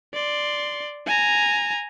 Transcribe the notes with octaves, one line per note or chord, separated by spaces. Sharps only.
D5 C6
G#5 A#5